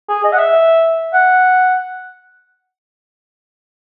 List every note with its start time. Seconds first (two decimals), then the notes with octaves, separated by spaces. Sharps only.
0.09 G#4
0.24 D#5
0.32 F#5
0.38 E5
1.13 F#5